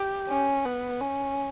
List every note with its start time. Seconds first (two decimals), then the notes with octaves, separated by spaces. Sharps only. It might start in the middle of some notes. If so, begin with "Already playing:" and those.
Already playing: G4
0.29 C#4
0.65 B3
1.01 C#4